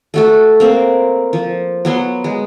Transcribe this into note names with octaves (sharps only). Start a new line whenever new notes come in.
A3 F#4 A4
A#3 C4
F3
F#3 B3 C6
G#3